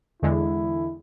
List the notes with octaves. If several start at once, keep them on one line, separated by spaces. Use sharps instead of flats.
E2 D3 G#3 E4